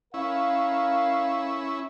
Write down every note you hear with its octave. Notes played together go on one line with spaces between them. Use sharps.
C#4 E4 A#4 F5